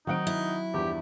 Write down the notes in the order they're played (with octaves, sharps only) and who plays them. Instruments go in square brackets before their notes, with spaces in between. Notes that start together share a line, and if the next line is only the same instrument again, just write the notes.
[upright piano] D#3 F#5 D7 [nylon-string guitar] F#3 C4 [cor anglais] D#4
[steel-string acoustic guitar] E4
[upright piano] E2 G2 F3 [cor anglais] G4